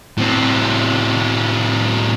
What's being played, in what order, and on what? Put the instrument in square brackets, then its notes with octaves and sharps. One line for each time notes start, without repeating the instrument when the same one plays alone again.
[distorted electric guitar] A2 C4